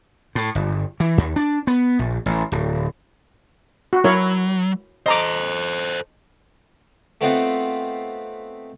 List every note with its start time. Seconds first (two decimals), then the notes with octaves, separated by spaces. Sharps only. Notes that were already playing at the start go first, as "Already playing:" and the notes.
0.35 A2
0.55 G1
1.00 E3
1.18 D#2
1.36 D4
1.67 B3
1.99 A#1
2.26 A1
2.52 D1
3.93 F#4
4.04 F#3 E4 A#4 C#5
5.06 A4 C5 D#5 A#5 D6
7.21 A3 B3 C4 D#4 F4 F#5